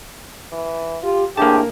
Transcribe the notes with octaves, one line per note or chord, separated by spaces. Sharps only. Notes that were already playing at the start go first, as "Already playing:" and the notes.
E3
F4 G4
A2 C3 A#3 D4 G4 G#4 A5